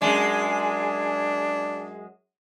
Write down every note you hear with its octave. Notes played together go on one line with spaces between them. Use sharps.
F#2 G#3 D4